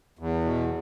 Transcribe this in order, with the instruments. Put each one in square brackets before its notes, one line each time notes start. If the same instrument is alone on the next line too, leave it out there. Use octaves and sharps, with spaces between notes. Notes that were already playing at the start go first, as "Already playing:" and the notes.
[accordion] E2
B2